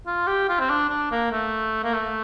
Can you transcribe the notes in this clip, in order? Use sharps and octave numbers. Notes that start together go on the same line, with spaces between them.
F4
G4
F4
C4
D4
D4
A#3
A3
A#3
A3